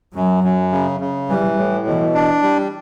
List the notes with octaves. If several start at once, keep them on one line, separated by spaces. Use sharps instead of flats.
F#2 F#3
F#2
C#3
C#3
E3 G3
A2
B2 E3
D4
G3